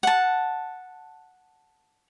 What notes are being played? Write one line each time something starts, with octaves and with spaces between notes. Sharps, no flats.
F#5 A5